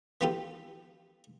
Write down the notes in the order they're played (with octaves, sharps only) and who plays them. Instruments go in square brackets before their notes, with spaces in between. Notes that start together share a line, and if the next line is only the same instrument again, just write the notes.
[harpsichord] E3 B3 F4 G4 A4